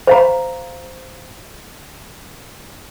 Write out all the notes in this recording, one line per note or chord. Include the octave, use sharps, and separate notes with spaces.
C5 F5 A#5